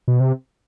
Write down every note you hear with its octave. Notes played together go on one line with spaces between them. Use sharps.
B2
C3